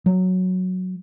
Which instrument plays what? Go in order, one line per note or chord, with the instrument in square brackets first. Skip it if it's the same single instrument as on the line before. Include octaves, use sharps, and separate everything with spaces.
[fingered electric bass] F#3